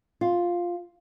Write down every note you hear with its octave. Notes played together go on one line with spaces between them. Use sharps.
F4